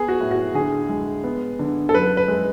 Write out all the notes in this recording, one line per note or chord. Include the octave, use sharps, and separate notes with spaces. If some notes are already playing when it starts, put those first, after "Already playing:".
Already playing: B3 G#4
F#4
A2
F#4
D3 G#4
G#3
B3
D3
A4
F#2 B4
B4
G#3